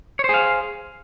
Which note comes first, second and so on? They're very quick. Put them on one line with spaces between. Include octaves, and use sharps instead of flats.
C#5 C5 G#4 F5